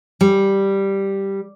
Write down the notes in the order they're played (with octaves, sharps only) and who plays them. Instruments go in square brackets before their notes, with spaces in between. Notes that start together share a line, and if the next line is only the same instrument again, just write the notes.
[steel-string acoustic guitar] G3